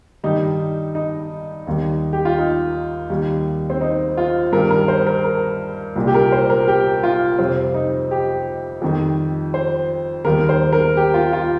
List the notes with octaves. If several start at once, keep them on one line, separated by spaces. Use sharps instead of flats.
G2 D#3 G3 D#4
D#4
D#2 D#3 G3
G4
F4
D#4
D#2 D#3 G3
C4
D#4
F4
G2 D#3 G3 A#4
A#4
C5
A#4
A#4
C2 A#2 G3
G4
A#4
C5
A#4
G4
F4
F2 C3 G3 C4
D#4
G4
F2 D#3 G3
C5
D#2 D#3 G3 A#4
C5
A#4
G4
F4
F4